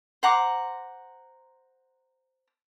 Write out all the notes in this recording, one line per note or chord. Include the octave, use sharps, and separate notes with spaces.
C5 F#5 A#5 D6